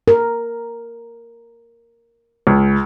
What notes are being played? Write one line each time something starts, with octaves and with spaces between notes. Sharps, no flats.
A#4
C#2